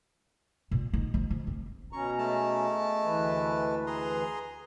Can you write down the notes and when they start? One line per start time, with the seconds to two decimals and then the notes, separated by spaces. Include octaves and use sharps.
0.71 A#2
0.93 D#4
1.14 F3
1.30 F3
1.47 C4
1.93 B2 C#4 A#5 C#6
2.18 G#3 A3 A5
3.04 D2 E3 B4
3.87 G#4 A#5 C6